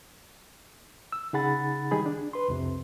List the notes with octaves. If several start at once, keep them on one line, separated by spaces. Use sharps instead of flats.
E6
C#3 D#4 G#4 F#5 B5 A6
D#3 G3 D#4 G#4 B5
D4
B4 C6
C2 F2 C3